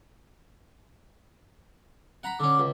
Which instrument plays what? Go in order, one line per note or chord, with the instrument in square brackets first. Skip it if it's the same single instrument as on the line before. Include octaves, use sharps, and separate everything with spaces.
[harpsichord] F#5 A#5 B5
[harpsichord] D3 C#4 [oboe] D6
[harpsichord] C#2